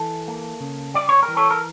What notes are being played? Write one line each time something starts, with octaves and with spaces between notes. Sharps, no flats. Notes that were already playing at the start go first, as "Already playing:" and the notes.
Already playing: E3 A4
A#3
C#3
G3 D5
C#5
A#4
E3
A4 C#5
A#4